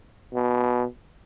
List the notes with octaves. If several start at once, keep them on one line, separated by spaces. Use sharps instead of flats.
B2